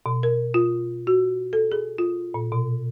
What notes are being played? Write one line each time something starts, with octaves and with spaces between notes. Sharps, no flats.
B2
A#4
F4
F#4
A4
G#4
F4
A#2
B2